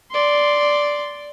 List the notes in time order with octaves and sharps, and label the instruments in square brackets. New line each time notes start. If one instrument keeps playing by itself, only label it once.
[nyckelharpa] D5 C6